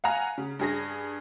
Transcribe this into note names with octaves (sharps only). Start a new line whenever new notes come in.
F5 F#5 G#5 A#5
C#3
G2 G#4 A#6